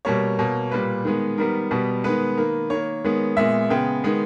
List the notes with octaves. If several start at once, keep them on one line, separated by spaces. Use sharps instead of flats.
B2 G3 A#3 C#5
B2 A#3
A#2 G3 A#3 B4
D#3 G#3 B3
D#3 G3 B3 A#4
B2 G3 B3
D#3 G#3 B3 B4
D#3 A#3
D#3 A#3 C#5
D#3 G#3 B3
A#2 G#3 B3 E5
C#3 G#3 B3 G5
D#3 G#3 B3